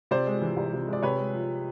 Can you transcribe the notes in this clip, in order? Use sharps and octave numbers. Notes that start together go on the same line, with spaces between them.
C3 C5 D5
G#3
E3
C2
C3
G#3 D5
C3 B4 C#5
G#3
F3